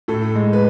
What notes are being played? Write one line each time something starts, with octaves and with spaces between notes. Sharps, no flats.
A2 A4
G#3
B4